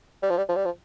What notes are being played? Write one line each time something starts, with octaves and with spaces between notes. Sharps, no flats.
G3
F3
G3
F3
G3
F3